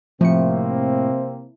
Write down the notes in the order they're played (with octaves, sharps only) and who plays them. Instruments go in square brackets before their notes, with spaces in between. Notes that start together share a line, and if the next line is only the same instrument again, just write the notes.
[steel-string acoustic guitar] A2 [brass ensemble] C3 A#3 C4 [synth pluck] F3 C#7